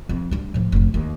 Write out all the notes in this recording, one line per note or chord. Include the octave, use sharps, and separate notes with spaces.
F2
G3 D4
A2 F3
F1 F3
D#2